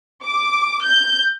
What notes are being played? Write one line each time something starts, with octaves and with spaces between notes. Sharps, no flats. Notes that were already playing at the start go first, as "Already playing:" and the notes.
D6
G6